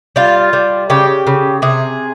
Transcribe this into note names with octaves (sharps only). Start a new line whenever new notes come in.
G3 F4
G3
C#3 G4
C#3
C3 G#4